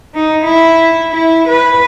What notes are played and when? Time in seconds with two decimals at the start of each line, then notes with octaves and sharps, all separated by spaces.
0.15 D#4
0.45 E4
1.12 E4
1.48 B4